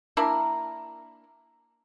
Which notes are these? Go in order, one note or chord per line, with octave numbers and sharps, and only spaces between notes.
A#3 D4 E4 A#4